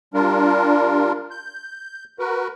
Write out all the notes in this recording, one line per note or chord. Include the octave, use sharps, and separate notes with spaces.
G3 D4 F4 A#4
G6
F#4 A#4 B4